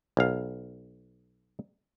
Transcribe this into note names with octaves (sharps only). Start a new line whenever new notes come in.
B1 F5